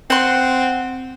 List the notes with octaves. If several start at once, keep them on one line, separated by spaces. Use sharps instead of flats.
C4 F#5 C6